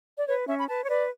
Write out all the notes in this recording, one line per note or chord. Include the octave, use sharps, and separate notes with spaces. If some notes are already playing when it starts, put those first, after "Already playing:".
D5
B4 C#5
C#4 E5
B5
B4 A5
C#5
B4 D5